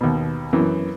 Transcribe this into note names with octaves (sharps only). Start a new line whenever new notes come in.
D#2 B2
F#2 E3